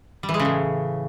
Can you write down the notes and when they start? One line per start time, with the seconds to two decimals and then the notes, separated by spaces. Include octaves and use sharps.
0.23 G3
0.29 E3
0.34 G#3
0.39 C#3
0.45 A2